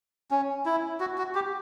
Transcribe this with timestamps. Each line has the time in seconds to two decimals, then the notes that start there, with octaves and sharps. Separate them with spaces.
0.31 C#4
0.66 E4
1.00 F#4
1.18 F#4
1.35 G4